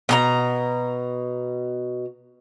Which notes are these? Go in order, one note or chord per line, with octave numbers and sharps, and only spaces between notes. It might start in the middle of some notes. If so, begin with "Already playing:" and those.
B2 G#4 A#5